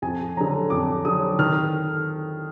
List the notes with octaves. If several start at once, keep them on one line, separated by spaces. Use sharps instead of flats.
F2 G#5
D3 F#3 A#5
F2 D6
D3 F#3 D#6
D#3 F6